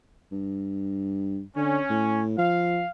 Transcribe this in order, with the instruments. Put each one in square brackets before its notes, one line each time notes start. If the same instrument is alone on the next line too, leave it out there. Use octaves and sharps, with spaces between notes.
[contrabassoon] G2
[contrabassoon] D3 [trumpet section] C#4
[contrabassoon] A2
[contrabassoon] F3 [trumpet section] F5